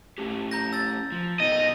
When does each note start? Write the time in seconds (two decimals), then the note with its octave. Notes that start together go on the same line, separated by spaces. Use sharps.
0.18 A3 C#4 G4
0.51 A#5 G6 A#6
0.73 E6 A6
1.12 F3
1.40 B2 D#3 D#4 D#5